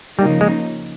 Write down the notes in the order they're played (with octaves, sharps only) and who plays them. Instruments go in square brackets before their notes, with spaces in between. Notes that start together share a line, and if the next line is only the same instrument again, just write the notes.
[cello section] C#3 F3 A#3 D#4 [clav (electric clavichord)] G3
[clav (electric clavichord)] G#3